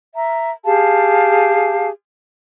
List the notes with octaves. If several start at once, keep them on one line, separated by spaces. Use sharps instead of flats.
E5 A#5
G4 G#4 F5 A5